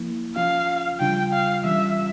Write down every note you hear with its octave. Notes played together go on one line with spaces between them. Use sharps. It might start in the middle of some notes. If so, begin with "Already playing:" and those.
Already playing: F3 A#3 E4
F3 C#4 F4 F5
C#3 G3 D4 F4 G5
F5
E3 G3 C#4 F4 E5